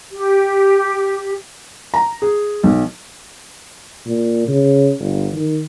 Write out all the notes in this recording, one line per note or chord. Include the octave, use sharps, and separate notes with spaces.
G4
A#5
G#4
B1
A#2
C#3
G1
D#3